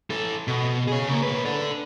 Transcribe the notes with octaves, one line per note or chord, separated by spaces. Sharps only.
E3 A4
B2
G#4 C#5
C#3 A#3
A2 B4
A4 D5